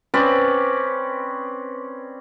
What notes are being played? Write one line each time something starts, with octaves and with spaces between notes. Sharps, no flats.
C4 C#4 B4 D5